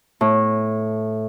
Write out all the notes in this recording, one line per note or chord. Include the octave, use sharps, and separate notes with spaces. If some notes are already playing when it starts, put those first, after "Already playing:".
A2